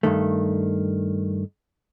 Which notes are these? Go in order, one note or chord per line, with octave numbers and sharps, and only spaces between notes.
G2 D#3 A3